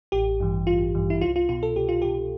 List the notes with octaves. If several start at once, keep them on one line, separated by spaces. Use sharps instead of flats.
A1 G4
G2 E3
A1 F4
G2 E3
E4
C2 F4
F4
B2 F4
A4
C2 G4
F4
B2 G4